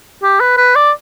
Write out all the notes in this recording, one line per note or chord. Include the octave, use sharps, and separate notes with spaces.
G4
B4
B4
D5